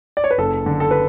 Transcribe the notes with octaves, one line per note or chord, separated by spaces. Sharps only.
D5
C#5
B4
F#1 A4
D3
A4
B4